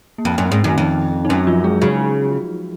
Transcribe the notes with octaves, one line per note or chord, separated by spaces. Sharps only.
A#3
F2 C4
F#2 C#4
C4
G#2 C#4
F#2 D#3 D#4
F2 D#3 D#4
D#4
F#2 C#4
D#4
F3 F4
G#3 G#4
C#3 F#3 F#4